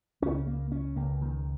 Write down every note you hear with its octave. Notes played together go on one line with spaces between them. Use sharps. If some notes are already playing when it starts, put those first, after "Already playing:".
C#2 C#3 C#4
A#3
C#4
C#2 C#3 A#3
D#3